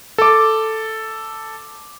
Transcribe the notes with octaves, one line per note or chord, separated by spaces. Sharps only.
A4 D6